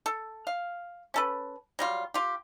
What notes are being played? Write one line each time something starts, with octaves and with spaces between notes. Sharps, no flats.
A4
F5
C#4 A4 B4
F#3 G3 F4
F4 G4